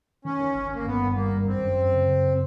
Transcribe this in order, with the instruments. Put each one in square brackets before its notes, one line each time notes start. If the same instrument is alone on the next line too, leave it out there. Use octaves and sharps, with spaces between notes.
[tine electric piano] D#3 [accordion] C#4
[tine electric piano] D#3
G1
[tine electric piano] G1 [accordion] A#3
[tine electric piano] G2 [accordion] B3
[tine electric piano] G2
[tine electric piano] G3 [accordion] A#3
[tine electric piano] G2
[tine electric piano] F#2 [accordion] C4
[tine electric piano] F#2
F#2
C#3
C#3